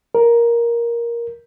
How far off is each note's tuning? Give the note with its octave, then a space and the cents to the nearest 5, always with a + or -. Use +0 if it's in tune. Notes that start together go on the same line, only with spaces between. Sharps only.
A#4 +10